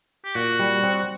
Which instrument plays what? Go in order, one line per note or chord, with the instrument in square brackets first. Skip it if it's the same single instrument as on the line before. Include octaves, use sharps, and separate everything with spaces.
[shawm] G4
[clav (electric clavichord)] A#2 [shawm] F#4
[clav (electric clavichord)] G3
C4